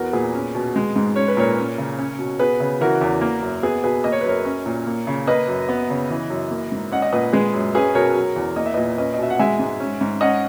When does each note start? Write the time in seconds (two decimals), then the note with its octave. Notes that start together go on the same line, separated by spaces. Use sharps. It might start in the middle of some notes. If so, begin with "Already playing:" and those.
Already playing: E2 B3 F#4 A#4
0.13 A#2 G#4 B4
0.34 C#4
0.55 B2
0.76 G#3
0.96 G#2
1.16 C#4 C#5
1.28 B4
1.37 A#2 A#4 C#5
1.57 C#4
1.78 C#3
1.99 C#4
2.19 B2
2.39 B3 G#4 B4
2.60 C#3
2.81 E3 F#4 A#4
3.01 E2
3.21 A#3
3.42 F#2
3.63 B3 G#4
3.84 B2 G#4 B4
4.04 A#3 D#5
4.12 C#5
4.21 B4
4.24 F#2 A#4 C#5
4.45 C#4
4.66 A#2
4.87 A#3
5.07 C#3
5.27 A#3 B4 D#5
5.48 F#2
5.69 B3
5.90 C#3
6.10 E3
6.30 F#2
6.51 A#3
6.72 G#2
6.92 C#4 D#5 F#5
7.02 D#5 F#5
7.12 A#2 B4 D#5
7.33 G#3 G#4 B4
7.54 F#2
7.74 C#4 G#4 B4
7.95 B2 A#4 C#5
8.15 F#3
8.36 E2
8.56 A#3 D#5
8.66 E5
8.74 A#2 B4 D#5
8.98 C#4 B4 D#5
9.14 D#5
9.18 B2 E5
9.30 F#5
9.39 G#3 E5 G#5
9.59 G#2
9.80 C#4
10.01 G#2
10.21 C#4 D#5 F#5